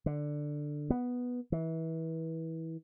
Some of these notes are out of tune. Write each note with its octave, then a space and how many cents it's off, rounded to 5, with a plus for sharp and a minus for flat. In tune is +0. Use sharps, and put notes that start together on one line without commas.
D3 +10
B3 -5
E3 -25